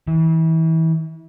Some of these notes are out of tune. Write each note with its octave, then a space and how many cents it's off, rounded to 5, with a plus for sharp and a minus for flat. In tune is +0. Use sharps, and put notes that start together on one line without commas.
E3 -30